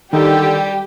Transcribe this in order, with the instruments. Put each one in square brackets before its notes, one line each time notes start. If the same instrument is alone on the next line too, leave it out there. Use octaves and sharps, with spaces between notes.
[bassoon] D3 [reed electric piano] D#3 D#4 E6 [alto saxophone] G3 [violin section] G4